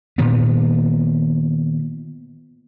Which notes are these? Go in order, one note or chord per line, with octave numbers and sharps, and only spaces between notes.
A#2 D#3 B3